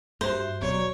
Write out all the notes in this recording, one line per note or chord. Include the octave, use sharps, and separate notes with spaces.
G2 F#4 G4 C5 E5
D#1 B2 F#3 C#5 D5 A#5 C#6